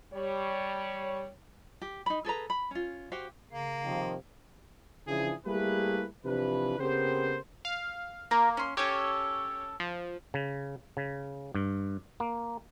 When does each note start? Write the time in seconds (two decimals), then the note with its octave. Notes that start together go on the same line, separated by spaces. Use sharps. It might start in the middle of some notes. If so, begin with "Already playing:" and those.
0.12 G3 C#5
1.82 G4
2.06 D#4 B5
2.25 G#4 A4 B4 A#5
2.50 B5
2.71 C#4 F4
3.12 F#4 G4 C5 F5
3.51 C#3 A#3 F5
3.84 C3 D#3 F3
5.08 C#3 E3 F3 D4 E4 G#4
5.47 G3 A3 A#3 E4 G#4 B4
6.25 C3 E3 F3 D4 B4
6.79 C#3 B3 C4 G4 A#4 C5
7.65 F5
8.31 A#3 A#4
8.57 C#4 C6
8.77 C#4 G4 A4 C#5
9.80 F3
10.34 C#3
10.97 C#3
11.55 G2
12.20 A#3